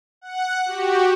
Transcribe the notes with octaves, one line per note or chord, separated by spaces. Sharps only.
F#5
F#4 G4